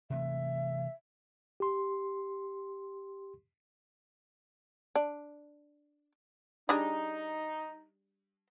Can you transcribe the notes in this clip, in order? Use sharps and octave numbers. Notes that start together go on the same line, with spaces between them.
C3 E3 A3 E5
G4 C6
D4
G3 D4 D#4 G#4